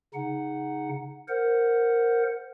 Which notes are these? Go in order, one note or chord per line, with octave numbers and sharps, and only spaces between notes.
C#3 D#4 F#5
A#4 C5 F#5